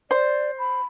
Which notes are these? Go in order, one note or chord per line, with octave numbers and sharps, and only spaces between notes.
C5 D5
B5